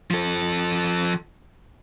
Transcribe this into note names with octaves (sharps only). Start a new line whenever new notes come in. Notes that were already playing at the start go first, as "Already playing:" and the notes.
F3 A4